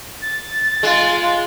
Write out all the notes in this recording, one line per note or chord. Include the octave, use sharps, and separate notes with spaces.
A6
G#3 F4